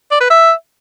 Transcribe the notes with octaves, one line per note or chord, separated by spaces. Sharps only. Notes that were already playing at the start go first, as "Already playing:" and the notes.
D5
B4
E5